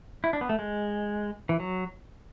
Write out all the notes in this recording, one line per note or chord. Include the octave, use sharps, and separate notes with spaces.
E4
D4
B3
A3
G#3
E3
F#3